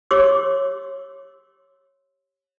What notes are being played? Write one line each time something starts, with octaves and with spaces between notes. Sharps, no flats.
G4 C#5 C6 D6 E6